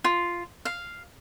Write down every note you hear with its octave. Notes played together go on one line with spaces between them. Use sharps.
F4
F5